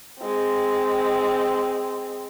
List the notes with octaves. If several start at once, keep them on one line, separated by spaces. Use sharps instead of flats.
G#3 C4